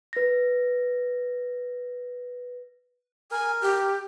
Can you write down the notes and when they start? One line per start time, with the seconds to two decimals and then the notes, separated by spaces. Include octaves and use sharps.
0.13 B4 A#6
3.31 A#4 G#5
3.62 G4